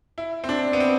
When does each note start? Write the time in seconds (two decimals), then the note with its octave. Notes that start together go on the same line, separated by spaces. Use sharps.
0.18 E4
0.44 C4
0.49 D4
0.73 B3
0.80 C4